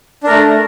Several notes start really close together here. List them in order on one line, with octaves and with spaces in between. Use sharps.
D4 A#4 A3